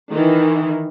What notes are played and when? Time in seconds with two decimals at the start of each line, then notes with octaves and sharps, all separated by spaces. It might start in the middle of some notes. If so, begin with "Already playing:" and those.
0.13 D#3 E3